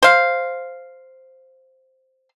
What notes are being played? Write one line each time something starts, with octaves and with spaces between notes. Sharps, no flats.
C5 F5